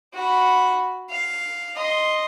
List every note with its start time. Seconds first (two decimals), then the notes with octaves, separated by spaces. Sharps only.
0.14 F#4 B5
1.10 F5
1.76 D#5 C6